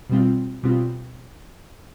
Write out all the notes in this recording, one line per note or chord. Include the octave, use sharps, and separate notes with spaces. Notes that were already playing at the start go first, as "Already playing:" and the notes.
B2 G3 C4 F4
B2 G3 C4 F4